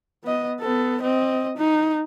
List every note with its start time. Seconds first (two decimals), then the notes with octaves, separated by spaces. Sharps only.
0.24 B3 D#5
0.60 B3 A4
1.01 C4 D#5
1.58 D#4